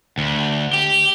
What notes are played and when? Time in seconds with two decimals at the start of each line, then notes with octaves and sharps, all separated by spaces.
0.18 D2
0.73 G4